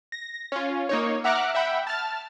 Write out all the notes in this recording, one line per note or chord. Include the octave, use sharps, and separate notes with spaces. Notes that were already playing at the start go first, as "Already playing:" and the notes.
A#6
C#4 F4
A#3 D#4 C#5
E5 F#5 A#5 D6 F6 F#6
E5 F#5 G5 B5
A5 F6 A6